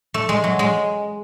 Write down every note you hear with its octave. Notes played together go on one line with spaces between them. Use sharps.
A3
G#3
F#3
G#3